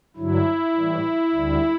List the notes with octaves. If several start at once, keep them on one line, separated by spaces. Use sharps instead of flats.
G2 D3 F#3 E4
A2 E3 G3
D2 D3 G3